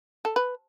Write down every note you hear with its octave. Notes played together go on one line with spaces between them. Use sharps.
A4
B4